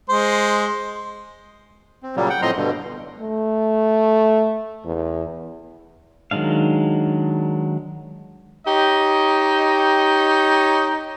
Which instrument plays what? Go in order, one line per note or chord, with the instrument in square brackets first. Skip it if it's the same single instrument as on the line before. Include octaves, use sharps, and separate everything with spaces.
[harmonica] G#3 C5
[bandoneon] C4
A#2 C#3 F#3 G3 A#3
F#5 G5
A2 F3 C4 D#5 A#5 C6
G2 B2 D3
[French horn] A3
E2
[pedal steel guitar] D#3 F#3 G#3 D4 F5
[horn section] D#4 G4 C#5 D#5